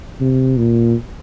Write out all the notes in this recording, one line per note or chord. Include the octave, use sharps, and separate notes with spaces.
C3
A#2